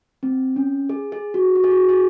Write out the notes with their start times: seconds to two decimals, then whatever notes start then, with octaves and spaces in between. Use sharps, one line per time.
0.23 C4
0.56 C#4
0.89 G#4
1.12 G#4
1.34 F#4
1.56 F#4
1.64 G#4
1.71 F#4
1.89 G#4